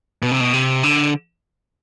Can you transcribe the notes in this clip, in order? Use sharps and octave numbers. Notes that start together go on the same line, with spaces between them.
B2
C3
B2
C3
D3